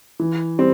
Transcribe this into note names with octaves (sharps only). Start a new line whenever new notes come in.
E3
G3 C4